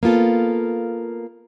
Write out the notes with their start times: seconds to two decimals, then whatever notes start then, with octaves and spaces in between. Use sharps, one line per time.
0.03 A#3 B3 F4 A4